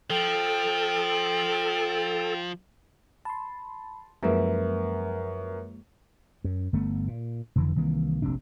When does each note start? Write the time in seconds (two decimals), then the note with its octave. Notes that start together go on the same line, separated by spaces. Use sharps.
0.10 F3 A4 G5
3.25 A5 B5 C6
4.23 F#2 F3 G#3 A#3 A#4 B4 E5
6.44 F#2
6.73 G1 A3 B3
7.08 A#2
7.56 F1 F2 D3 E3
7.76 C2 D#3 E3 A#3
8.22 F1 A#1 C3 D4